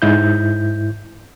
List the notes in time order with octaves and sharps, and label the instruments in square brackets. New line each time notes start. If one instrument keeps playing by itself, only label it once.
[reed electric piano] G#2 E4 G6